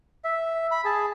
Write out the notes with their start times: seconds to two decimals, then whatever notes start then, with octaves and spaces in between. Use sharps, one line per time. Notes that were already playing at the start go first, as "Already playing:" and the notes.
0.24 E5
0.71 B5
0.85 G#4 A5